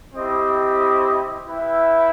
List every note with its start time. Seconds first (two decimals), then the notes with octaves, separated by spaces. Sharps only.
0.13 C4 E4 G4 D#5
1.46 E4 B4 E5 G5